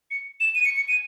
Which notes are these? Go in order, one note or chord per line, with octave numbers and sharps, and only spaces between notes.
C#7
E7
D#7
C#7
C#7
D#7